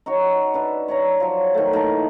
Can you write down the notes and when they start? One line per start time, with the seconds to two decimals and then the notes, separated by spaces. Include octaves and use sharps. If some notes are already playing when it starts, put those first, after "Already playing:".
0.06 D#4 F#4 C#5
0.54 D4 B4 E5
0.88 C#5 D5 A#5
1.20 F3 F#3
1.54 D#3 A3
1.73 D#3 E3 A#3 A5